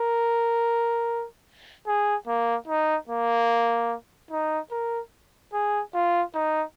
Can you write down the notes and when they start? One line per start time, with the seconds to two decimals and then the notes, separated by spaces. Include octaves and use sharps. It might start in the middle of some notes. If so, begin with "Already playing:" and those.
Already playing: A#4
1.87 G#4
2.27 A#3
2.68 D#4
3.09 A#3
4.31 D#4
4.71 A#4
5.53 G#4
5.94 F4
6.34 D#4